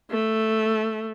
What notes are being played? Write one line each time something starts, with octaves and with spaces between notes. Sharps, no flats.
A3